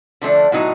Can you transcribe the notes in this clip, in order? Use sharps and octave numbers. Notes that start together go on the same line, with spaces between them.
D3 F3 A3 D4
A2 F#3 B3 D#4